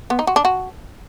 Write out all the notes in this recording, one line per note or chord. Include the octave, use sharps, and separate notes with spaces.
B3
D#4
F#4
D4
F#4